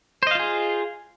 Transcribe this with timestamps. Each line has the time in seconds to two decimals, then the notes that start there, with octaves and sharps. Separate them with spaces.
0.23 C5
0.27 D#5
0.31 F5
0.35 F4
0.39 G#4